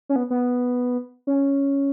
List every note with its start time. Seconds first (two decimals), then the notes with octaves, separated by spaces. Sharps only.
0.09 C#4
0.16 B3
0.30 B3
1.27 C#4